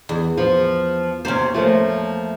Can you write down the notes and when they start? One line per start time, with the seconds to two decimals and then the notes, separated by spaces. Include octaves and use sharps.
0.09 E2
0.38 F3
1.25 D#2 C3 C#4 C5
1.54 F3 A3 A#3